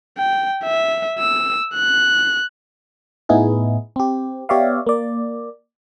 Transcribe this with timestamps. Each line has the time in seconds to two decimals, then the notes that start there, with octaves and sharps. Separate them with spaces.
0.18 G5
0.64 E5
1.19 E6
1.74 F#6
3.29 A2 B3 D#4 E4 G#4
3.96 C4 G4
4.49 B3 G4 C#5 D5 E5 F5
4.87 A#3 D5